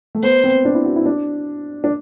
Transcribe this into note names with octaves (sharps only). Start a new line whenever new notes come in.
A3
B3 C5
C4
D4
E4
F#4
E4
D4
D4